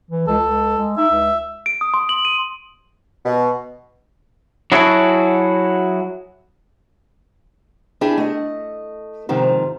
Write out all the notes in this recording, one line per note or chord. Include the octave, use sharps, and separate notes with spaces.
E3
C#2 A4
C#2
G#3
D#4 E5
C#2
D7
D#6
C6
F#7
D#7
B2
F#3 E4 F#4 G#4 A4
D4 E4 G4 G#4
A3 D#5
G#2 C3 D#3 F3